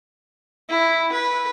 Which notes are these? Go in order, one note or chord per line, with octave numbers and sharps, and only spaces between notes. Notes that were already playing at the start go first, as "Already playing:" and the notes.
E4
B4